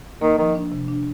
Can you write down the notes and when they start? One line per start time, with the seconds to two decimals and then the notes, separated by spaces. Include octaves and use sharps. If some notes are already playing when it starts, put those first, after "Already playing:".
0.21 D#3 A#3
0.38 D#3 F3
0.55 D4
0.72 C3
0.88 D4